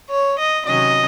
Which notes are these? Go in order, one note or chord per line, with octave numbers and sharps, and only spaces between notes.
C#5
D#5
C3 D#3 F#3 C#4 D#5